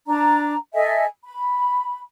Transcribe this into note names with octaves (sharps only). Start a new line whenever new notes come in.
D4 A#5
A4 D#5 E5 G#5
B5